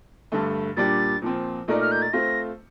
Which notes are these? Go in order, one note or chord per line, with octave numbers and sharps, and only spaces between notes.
G2 D3 A3
A#2 G3 D4 G4 A6
A#2 F3 C4
A#2 A3 D#4 A#4 D5
F6
G6
A6
A3 C4 F4 C5 A#6